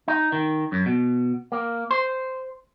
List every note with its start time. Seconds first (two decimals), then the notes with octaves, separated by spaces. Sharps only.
0.08 D#4
0.32 D#3
0.72 F#2
0.86 B2
1.52 A#3
1.91 C5